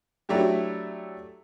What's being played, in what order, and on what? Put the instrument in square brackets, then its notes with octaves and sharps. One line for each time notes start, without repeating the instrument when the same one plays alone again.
[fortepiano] F#3 A3 D4 E4 G4